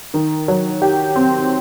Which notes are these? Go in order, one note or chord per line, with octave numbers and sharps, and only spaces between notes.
D#3
F#3
G4
C4